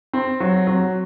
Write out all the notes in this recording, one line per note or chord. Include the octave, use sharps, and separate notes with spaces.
C4
F#3
F#3